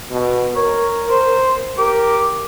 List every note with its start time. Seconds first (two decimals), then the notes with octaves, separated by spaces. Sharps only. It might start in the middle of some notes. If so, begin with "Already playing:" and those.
0.11 B2
0.55 A#4 C#5
1.10 C5
1.78 G4 A#4